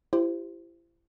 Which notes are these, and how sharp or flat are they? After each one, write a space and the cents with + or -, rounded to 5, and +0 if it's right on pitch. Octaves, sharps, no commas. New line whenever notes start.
E4 +40 G4 +0 C5 -10